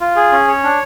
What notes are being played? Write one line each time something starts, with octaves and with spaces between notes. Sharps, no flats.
F4
G#4
C#4
C#5
D4